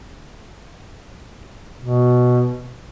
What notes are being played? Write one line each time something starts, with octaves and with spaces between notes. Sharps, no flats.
B2